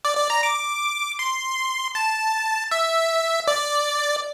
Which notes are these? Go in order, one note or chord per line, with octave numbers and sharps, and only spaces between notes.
D5
D5
A#5
D6
C6
A5
E5
D5